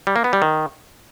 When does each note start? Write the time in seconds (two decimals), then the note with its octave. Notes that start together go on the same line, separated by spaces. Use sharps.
0.07 G3
0.16 A#3
0.24 B3
0.33 G3
0.42 D#3